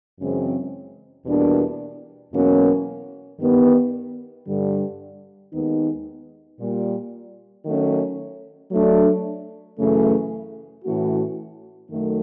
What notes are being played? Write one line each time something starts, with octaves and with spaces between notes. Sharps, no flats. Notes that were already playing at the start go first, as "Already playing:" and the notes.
F#2 C#3 E3 G#3 C4
E2 B2 G3 A#3 D4
E2 B2 F#3 A#3 C#4
G2 D#3 G3 B3
G2 D3 G3
D#2 D#3 G#3 B3 D#4
A#2 G3 A#3
D#3 F#3 A3 C#4
F#3 A3 D4
F#2 C#3 E3 A3
A2 E3 A3 C#4 F#4
F#2 D#3 F#3 A3